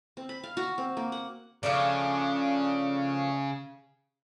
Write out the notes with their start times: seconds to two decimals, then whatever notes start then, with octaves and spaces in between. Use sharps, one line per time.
0.17 C4
0.29 B5
0.44 F5
0.57 F#4
0.78 C4
0.97 A#3
1.12 F#5
1.63 C#3 F3 A3 D4